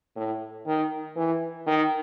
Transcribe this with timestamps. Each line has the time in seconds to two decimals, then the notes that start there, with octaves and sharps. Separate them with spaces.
0.16 A2
0.67 D#3
1.16 E3
1.67 D#3